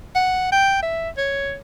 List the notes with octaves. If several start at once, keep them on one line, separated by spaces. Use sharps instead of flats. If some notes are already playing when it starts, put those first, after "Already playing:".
F#5
G5
E5
C#5